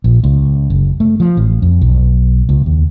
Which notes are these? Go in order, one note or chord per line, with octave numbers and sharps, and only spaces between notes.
A#1
C#2
F#1
A3
F3
A1
F2
B1
C#2
D#2